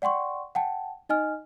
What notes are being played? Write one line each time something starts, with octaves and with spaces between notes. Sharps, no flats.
D5 F#5 G5 C6 C#6
F#5 G5 A5
D#4 D#5 G#5 F6